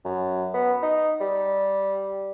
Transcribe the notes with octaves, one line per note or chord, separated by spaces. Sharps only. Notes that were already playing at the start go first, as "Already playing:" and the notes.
F#2
B3
D#4
G3